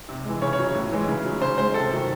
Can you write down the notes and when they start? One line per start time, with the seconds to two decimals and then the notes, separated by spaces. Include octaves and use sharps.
0.09 C3
0.25 E3 G#3
0.42 C#3 C#5
0.53 C#5
0.59 F#3
0.75 A2
0.92 E3 G#3
1.08 C#3
1.25 F#3
1.41 C#3 C5
1.58 G#3 C5
1.74 C3 A4
1.91 D#3 F#3